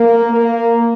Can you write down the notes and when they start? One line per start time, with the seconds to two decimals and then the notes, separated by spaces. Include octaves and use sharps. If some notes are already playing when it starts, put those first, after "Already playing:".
Already playing: A#3
0.31 A#3